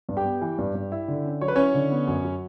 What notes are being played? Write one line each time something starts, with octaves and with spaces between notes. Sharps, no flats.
G2
G4 G5
B3
E3
G2
G2
E4
D3
C#4
F#3 C#5
B4
C#4 E4 C#5
D3
B3
F#2
F#3